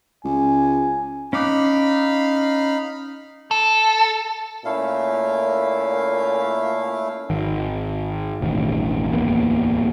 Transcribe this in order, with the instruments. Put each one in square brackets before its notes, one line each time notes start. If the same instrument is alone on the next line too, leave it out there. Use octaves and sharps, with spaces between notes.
[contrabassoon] C#2 [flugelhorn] G#5
[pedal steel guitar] C#4 D6 F#6 [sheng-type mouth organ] D#4 F5 B5
[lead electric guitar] A4
[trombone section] A#2 C#4 [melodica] A3 E4 F5
[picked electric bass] G#1 D#3
E1 A1 D#3
D1 E2 A#3 B3